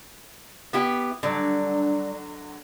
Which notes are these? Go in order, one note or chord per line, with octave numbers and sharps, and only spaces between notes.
B3 E4 G4
D3 F#3 G3 D4